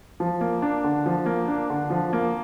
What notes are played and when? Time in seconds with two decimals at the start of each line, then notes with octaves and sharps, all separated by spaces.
0.20 F3
0.41 A#3
0.62 D4
0.84 D3
1.06 F3
1.26 A#3
1.48 D4
1.70 D3
1.90 F3
2.13 A#3